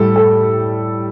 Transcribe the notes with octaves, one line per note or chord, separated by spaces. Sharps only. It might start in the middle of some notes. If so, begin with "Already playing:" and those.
Already playing: A2 G3 A4
A4